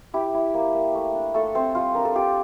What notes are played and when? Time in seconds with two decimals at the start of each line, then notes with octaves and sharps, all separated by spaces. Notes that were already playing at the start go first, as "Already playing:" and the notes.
0.14 E4 G4
0.34 E4
0.54 A#3
0.75 A#3
0.95 A3
1.15 D4
1.34 A3 F4 A4
1.55 A3 C4 C5
1.75 G3 F4
1.95 D4 A#4
2.05 A4
2.15 F4 G4